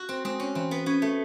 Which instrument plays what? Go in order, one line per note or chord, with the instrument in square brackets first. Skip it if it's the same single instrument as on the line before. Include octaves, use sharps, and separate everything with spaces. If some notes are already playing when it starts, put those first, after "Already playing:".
Already playing: [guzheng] F#4
C4
[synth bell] G#3 [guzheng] C4
[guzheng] C#4
[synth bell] E3 [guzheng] C4
[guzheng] B3
[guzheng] B3 [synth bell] C#4
[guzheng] A3